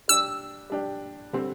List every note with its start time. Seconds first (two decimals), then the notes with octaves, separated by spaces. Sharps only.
0.08 G3 D4 G4 E6
0.70 G3 D4 G4
1.33 D3 G3 C4